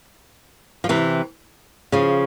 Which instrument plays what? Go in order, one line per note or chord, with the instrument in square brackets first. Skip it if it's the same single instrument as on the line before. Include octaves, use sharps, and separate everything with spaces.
[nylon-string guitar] F3
C3 E3
C#3 F3